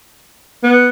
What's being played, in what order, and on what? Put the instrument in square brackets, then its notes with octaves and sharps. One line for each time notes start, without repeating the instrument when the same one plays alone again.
[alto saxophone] B3